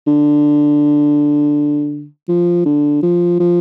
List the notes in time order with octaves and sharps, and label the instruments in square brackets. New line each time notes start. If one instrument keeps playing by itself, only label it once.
[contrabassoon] D3
F3
D3
F3
F3